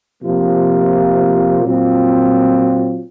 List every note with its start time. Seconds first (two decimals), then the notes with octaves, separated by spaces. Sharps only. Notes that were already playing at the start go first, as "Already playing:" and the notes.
0.22 C3 F3 A#3 F4
1.61 A#2 F#3 C4 F4